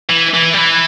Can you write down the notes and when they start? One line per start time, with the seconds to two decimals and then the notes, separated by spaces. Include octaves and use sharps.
0.10 E3
0.34 E3
0.54 G3
0.59 E3